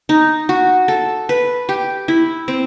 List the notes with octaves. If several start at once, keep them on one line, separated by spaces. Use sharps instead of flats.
D#4
F#4
A4
B4
G4
E4
C4